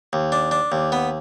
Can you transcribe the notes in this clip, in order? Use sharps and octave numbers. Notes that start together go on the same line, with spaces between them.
D#2
D4
D4
D#2
B3